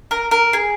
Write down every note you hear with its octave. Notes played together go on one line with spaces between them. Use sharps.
A#4
A#4
G#4